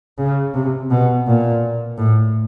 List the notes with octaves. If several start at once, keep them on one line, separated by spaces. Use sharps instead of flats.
C#3
C3
B2
A#2
A2